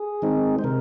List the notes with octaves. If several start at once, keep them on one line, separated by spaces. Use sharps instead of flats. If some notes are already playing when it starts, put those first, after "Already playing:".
Already playing: G#4
D#3 G#3 C4 D#4
C5
C3 A#4